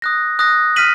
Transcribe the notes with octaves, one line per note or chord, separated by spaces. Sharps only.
D#6 F#6 A#6
D#6 F#6 A#6
F6 B6 D#7 F#7